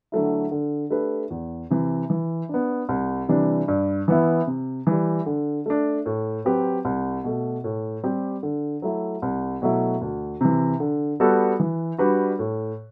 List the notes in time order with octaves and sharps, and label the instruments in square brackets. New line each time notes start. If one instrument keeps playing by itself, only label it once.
[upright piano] D3 F#3 A3 E4
D3
A3 D4 G4 B4
E2
C3 E3
E3
B3 D4
C2
C3 E3 G3 D4
G2
E3 B3 E4
C3
E3 G3
D3
A3 D4
A2
F#3 C4 G4 B4
C2
B2 A3
A2
G3 C4 G4
D3
F#3 A3 E4
C2
B2 F#3 A3 E4
D2
C3 E3
D3
G3 B3 F#4 A4
E3
G3 D4 F#4 B4
A2